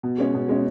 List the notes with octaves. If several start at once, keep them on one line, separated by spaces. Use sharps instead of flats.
B2
G#3 C#4
B2
G#3 C#4